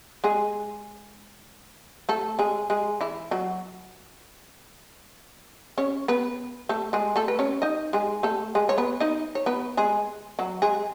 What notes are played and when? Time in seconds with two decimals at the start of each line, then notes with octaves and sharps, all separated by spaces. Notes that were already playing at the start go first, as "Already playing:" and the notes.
0.24 G#3 G#4
2.09 A3 A4
2.39 G#3 G#4
2.70 G#3 G#4
3.01 E3 E4
3.31 F#3 F#4
5.78 C#4 C#5
6.08 B3 B4
6.69 A3 A4
6.93 G#3 G#4
7.16 A3 A4
7.28 B4
7.39 C#4 C#5
7.62 D#4 D#5
7.93 G#3 G#4
8.23 A3 A4
8.55 G#3 G#4
8.69 C#5
8.78 B3 B4
9.00 D#4 D#5
9.35 C#5
9.46 B3 B4
9.77 G#3 G#4
10.39 F#3 F#4
10.62 G#3 G#4